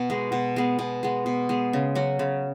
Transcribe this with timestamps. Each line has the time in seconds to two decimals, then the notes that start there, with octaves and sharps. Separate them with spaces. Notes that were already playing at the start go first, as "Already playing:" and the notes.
Already playing: B2
0.10 G#3 B3
0.32 B2
0.56 G#3 B3
0.79 B2
1.03 G#3 B3
1.26 B2
1.49 G#3 B3
1.73 C#3
1.95 F#3 C#4 F#4
2.19 C#3